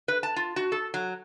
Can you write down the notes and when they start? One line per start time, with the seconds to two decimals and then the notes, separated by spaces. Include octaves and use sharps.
0.08 B4
0.23 A5
0.36 F4
0.56 F#4
0.72 A4
0.94 F#3